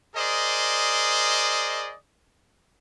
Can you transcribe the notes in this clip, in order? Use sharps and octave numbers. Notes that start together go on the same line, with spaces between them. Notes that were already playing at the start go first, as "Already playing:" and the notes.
G#4 A#4 C5 D5 D#5